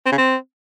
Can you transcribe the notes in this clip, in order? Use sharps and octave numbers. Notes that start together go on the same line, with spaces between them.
C4
C#3
C4